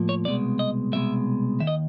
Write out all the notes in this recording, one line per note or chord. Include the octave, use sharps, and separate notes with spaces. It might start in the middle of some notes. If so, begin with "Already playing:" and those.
Already playing: A2 F3 A#3
C#5
C2 B2 G#3 D5
D#5
C2 B2 G#3 E5
D#2 D#3 E5
D#5